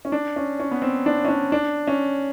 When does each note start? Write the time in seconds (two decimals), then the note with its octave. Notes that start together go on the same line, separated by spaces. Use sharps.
0.05 C#4
0.12 D4
0.36 C#4
0.60 C#4
0.71 B3
0.82 C4
1.06 D4
1.25 C#4
1.28 D4
1.52 D4
1.87 C#4